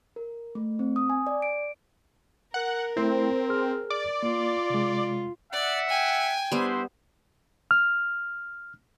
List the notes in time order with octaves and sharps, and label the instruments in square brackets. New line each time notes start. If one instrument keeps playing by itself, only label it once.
[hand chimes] A#4
A3
C4
D#6
G#5
D5
D7
[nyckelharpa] A#4 [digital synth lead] F#5
[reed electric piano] A3 E4 [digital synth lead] C4
[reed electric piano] G#4 F6
[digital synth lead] D5
[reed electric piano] A#3 [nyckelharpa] F4
[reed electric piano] C3 G#3
[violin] D5 [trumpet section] E5 F#5
[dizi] G5 [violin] G#5
[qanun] G3 B3 [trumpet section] D4 E4 C5
[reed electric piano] F6